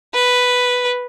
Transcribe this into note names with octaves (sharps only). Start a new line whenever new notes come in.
B4